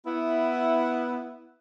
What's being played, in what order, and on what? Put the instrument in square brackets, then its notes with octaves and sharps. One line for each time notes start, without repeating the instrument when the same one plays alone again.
[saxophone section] B3 E4